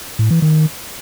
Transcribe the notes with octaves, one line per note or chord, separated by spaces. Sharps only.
A2
E3
D#3